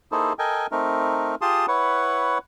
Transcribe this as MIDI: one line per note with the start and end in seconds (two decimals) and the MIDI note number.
0.12 0.33 58
0.12 0.33 63
0.12 0.33 64
0.12 0.33 68
0.12 0.33 69
0.12 0.33 72
0.39 0.67 69
0.39 0.67 70
0.39 0.67 75
0.39 0.67 79
0.39 0.67 80
0.71 1.35 57
0.71 1.35 60
0.71 1.35 63
0.71 1.35 70
1.41 1.66 65
1.41 1.66 67
1.41 1.66 68
1.41 1.66 81
1.41 1.66 84
1.41 1.66 87
1.68 2.38 64
1.68 2.38 71
1.68 2.38 73
1.68 2.38 78